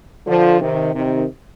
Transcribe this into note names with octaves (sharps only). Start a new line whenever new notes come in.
D3 F3
C3 D#3
C3 D#3